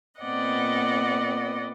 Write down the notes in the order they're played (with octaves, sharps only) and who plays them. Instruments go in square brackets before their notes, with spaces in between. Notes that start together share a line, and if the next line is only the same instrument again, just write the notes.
[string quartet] A#2 B3 C4 D5 D#5 F#5